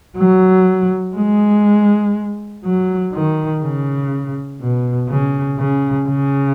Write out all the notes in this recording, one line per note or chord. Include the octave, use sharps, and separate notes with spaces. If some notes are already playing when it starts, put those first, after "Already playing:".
F#3
G#3
F#3
D#3
C#3
B2
C#3
C#3
C#3